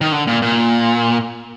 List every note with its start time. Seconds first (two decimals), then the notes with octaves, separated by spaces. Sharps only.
0.01 D#3
0.12 D3
0.27 A#2
0.42 A#2